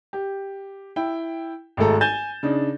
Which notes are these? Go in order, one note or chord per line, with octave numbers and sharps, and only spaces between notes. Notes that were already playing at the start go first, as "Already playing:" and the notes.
G4
E4 G5
G#1 G#3 A3 A4 A#5
G#5 G6 A6 E7 G7
C#3 D4 D#4